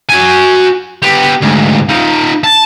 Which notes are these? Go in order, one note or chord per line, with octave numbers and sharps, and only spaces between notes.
F#4 G#5
B3 G4
D2 G#2
D#4 F4
A5